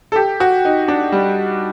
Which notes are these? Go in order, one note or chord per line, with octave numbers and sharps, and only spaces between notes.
A4
G4
F#4
D#4
D4
G3